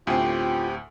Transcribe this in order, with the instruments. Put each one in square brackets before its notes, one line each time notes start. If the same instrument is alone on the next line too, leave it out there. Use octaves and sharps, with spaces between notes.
[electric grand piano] D2 A2 G#5 [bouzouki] B3 C4 [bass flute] F4 [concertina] G4